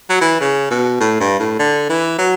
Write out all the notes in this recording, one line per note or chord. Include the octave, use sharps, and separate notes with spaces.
F#3
E3
C#3
B2
A2
G2
A2
D3
E3
F#3